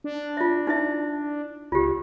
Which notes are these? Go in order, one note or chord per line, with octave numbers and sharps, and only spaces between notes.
D4
F4 E5
D#4 E4 E5
C#2 F4 G4